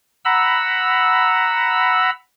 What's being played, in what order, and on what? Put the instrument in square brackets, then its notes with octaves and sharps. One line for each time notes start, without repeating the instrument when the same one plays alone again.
[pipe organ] F#5 A#5 B5 E6